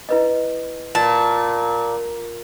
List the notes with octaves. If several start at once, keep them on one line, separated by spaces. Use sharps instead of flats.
E4 B4 D#5
A#2 A5